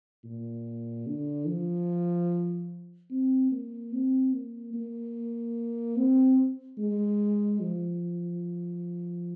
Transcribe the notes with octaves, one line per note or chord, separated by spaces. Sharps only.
A#2
D3
F3
C4
A#3
C4
A#3
A#3
C4
G#3
F3